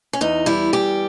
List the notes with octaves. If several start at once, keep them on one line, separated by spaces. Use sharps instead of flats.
C#4
E2 D#4
G3 E4
E2 G4